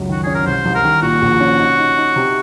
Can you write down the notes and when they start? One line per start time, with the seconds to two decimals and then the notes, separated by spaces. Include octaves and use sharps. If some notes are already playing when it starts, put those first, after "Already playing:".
Already playing: C#2 F#2
0.09 D#3 F#4
0.24 C#4 G#4
0.35 A#4
0.46 C2 C5
0.65 C2
0.75 A#4
0.84 D#3
1.02 A#2 F#4
1.22 A#1
1.40 C#4
1.59 D#4
1.79 D#4
1.98 D#4
2.16 C3